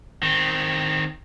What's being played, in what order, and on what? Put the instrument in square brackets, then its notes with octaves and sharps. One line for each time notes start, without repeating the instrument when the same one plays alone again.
[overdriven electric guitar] D#3 C4